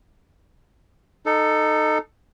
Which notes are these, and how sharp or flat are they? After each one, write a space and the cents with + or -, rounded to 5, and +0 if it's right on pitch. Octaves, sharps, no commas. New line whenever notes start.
D#4 -15 A4 +10